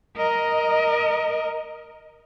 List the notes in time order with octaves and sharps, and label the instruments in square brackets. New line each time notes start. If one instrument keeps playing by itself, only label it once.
[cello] A#4 D#5